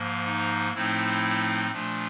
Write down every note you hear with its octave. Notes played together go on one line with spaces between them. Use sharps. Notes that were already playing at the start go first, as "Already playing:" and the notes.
Already playing: G#2 F3 A#3
D#4
A2 F3 A3 C4 D#4 E4
A#2 F3 A3 D4